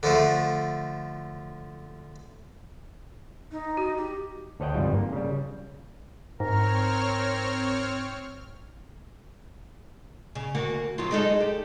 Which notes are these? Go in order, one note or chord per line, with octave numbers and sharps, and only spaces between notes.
D3 F3 A3
D#4
F#4
G4
D2 A4 C#5 D#5 F#5 G5
G1 F2 G#2 G3
A#3
C#3 G3
G#2 C4 A#4 C#5 F6
C#3
D2 A#3 F#4
F#3 B3 F4
G#3 D#4 A4
G4